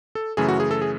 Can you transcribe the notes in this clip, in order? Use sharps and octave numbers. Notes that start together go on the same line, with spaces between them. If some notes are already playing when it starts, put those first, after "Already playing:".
A4
F#2 C#3 E3 A3 G#4
F#4
G#4
A4
G#4